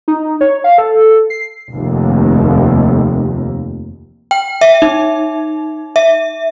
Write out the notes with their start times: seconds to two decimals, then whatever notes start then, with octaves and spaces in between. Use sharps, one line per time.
0.08 D#4
0.41 C#5
0.64 F5
0.78 A4
1.30 C7
1.71 F1 D#2
4.31 G5
4.61 E5
4.82 D#4
5.96 E5